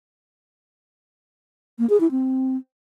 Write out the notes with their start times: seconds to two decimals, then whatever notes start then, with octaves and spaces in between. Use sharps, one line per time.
1.79 A#3
1.89 G#4
2.00 E4
2.11 C4